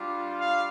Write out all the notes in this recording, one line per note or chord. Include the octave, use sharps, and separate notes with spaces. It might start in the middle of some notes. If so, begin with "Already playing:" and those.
Already playing: G3 D4 F4
F5